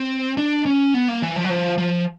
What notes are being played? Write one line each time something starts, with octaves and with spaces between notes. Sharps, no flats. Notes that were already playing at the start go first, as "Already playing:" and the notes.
Already playing: C4
D4
C#4
B3
A#3
E3
F3
F#3
F3
F3